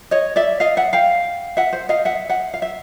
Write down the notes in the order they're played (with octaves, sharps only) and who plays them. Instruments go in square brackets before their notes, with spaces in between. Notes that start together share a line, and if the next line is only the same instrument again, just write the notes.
[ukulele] C#5 D#5
D5 E5
D#5 F5
E5 F#5
F5 G5
E5 F#5
C5
D#5 F5
E5 F#5
E5 F#5
F5
E5